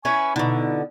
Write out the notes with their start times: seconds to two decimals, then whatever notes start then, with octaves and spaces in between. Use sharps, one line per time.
0.05 C#4 E4 B4 G#5 C#6
0.36 B2 D3 D#4 E4